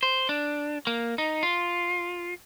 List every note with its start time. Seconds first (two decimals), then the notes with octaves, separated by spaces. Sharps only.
0.03 C5
0.29 D4
0.87 A#3
1.18 D#4
1.43 F4